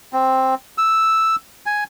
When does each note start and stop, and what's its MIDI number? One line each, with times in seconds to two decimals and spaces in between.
0.13 0.55 60
0.78 1.36 88
1.66 1.84 80